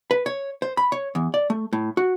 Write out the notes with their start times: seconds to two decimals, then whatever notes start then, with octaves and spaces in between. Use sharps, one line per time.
0.11 B4
0.26 C#5
0.62 C5
0.77 B5
0.92 C#5
1.15 E2
1.34 D5
1.50 A3
1.73 A2
1.97 F#4